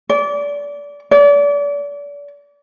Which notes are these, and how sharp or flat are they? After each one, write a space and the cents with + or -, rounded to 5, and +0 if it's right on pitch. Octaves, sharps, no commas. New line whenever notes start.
D5 -25
D5 -35